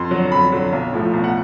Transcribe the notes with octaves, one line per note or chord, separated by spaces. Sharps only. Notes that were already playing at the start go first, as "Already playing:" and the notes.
Already playing: F2 C6
D3 F#3
F2 B5
D3 F#3
B1
A2 F3 A3
B1
F#5